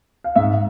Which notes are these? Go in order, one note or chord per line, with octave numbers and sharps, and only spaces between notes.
F5
G#2 E5